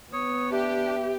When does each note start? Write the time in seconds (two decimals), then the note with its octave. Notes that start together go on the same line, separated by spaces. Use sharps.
0.13 B3 C#5 D#6
0.51 D4 G4 E5